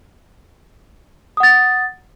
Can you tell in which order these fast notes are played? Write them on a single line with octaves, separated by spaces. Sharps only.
D#6 F#5 A6